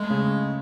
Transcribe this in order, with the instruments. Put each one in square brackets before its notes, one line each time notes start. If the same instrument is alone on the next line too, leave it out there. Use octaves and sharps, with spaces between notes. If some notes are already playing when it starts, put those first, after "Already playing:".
Already playing: [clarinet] G#3 [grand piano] A3
[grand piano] C#3